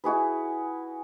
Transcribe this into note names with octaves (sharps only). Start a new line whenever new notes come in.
E4 F#4 G#4 B4